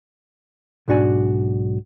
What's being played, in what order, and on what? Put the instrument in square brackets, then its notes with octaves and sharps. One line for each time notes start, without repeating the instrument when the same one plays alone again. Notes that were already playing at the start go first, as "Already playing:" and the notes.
[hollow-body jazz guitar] B1 G#2 D4 F#4 D5 G#5